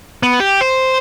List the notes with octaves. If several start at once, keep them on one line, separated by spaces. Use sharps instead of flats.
B3
G4
C5